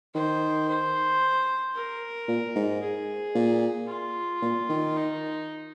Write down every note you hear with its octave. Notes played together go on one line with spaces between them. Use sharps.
D#3 C5
C5
A#4
A#2
G#2
G#4
A#2
F4
A#2
D#3
D#4